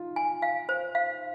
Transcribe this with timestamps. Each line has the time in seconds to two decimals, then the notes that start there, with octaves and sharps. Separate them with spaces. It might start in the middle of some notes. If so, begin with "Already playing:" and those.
Already playing: D#4 F4
0.16 G#5
0.42 F5
0.69 C5
0.95 F5